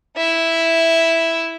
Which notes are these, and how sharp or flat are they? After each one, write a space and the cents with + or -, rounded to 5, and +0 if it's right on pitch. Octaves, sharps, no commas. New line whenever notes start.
E4 +0 E5 +0